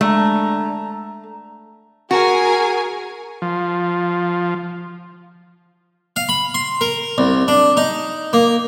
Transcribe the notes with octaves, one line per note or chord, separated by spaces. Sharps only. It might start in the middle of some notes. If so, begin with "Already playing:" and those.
D3 G#3 A3 A#5
F#4 G#4 A#4 G#5
F3
F5
B5
C6
A#4
C2
D4
D#4
A#3